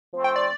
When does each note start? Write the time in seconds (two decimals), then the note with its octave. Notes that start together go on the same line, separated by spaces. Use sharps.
0.13 F3 A3 C4
0.24 G5
0.36 D5